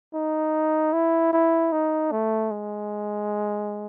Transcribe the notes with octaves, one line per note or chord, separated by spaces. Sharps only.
D#4
E4
E4
D#4
A3
G#3